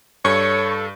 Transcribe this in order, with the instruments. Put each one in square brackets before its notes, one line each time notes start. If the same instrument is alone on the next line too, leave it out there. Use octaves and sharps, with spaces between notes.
[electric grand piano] G2 [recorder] A4 [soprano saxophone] C#5 [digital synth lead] C#6